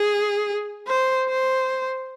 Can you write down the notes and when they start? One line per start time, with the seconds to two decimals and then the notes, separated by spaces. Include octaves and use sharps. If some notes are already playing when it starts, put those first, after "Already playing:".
Already playing: G#4
0.88 C5
1.29 C5